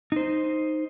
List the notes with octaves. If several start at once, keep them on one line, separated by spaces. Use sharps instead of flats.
D#4 C5